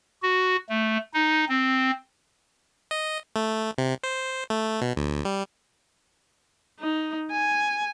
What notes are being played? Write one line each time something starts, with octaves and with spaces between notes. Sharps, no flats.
F#4
A3
D#4
C4
D#5
A3
C3
C5
A3
B2
D2
G3
D#4
G#5